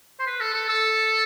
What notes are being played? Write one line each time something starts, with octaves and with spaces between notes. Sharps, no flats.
C5
B4
A4
A4
A4